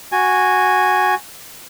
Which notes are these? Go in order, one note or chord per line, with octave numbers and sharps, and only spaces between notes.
F#4 G#5